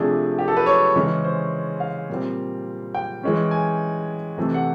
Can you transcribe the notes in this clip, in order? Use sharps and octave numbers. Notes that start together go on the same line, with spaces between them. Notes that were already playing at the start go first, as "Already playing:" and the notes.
Already playing: C3 F3 A3 D4 G#4
G4
A4
B4
C#5
C#3 E3 G#3 C#4
C5
F5
A#2 G3 C4
G5
E3 G#3 C#4
G#5
C3 E3 A3
F#5